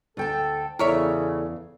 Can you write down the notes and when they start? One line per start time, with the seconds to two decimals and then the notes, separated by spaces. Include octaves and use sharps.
0.17 D2 A4 G5 A5
0.79 E2 C#3 E4 A4 A#4 C#5 D5 E5